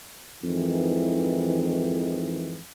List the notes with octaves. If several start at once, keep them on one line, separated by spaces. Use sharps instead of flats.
F2 G#2 D#3 E3